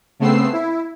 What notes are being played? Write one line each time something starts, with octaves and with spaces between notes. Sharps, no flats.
C#3 A3 B3 C4 E6 C7
E4